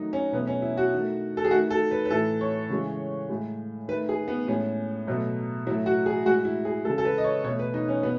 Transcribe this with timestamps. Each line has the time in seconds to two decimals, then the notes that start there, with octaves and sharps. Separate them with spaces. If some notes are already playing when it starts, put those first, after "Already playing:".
Already playing: D#3 F#3 A3 D#4
0.13 C#4
0.32 B2 F#3 A3 B3
0.47 C#4
0.62 E4
0.77 F#4
0.92 D#3 A3
1.37 A4
1.45 G#4
1.51 D#3 A3 F#4
1.70 A4
1.91 B4
2.05 B4
2.10 A2 E3 A3 A4
2.41 C#5
2.70 C#3 E3 G#3
3.29 A2 G#3
3.88 D#3 A3 B4
4.09 G#4
4.28 B3
4.48 A2 G#3 C#4
5.07 B2 F#3 A3
5.66 A2 F#3 A3 E4
5.86 F#4
6.06 G#4
6.26 A2 G#3 F#4
6.45 E4
6.65 G#4
6.85 C#3 G#3 A4
6.98 A4
7.05 B4
7.18 D#5
7.24 C#5
7.44 B2 C#5
7.48 A3
7.59 B4
7.74 D#4
7.88 C#4
8.03 B2 B3